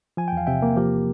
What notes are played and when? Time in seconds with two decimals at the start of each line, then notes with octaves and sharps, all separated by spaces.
0.17 F3 G#5
0.28 G5
0.32 E2 F5
0.47 C3 E5 G5
0.62 A#3
0.76 F3 G4 A#4